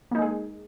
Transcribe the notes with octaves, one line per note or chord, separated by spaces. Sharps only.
G#3 A#3 D#4 G#4